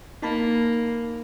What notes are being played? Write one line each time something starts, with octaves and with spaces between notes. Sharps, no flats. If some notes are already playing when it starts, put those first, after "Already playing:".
A#3 D#4 A5 B5